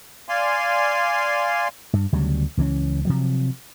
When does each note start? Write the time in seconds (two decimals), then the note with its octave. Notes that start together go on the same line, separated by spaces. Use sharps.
0.29 D5 F5 G#5 C6
1.93 G2
2.12 D2 C#3 F#3 G3
2.57 C#2 E3 G#3 C#4
3.05 C3 F3 F#3